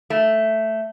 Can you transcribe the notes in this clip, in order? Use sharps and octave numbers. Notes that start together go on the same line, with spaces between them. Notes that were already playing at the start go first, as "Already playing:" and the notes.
A3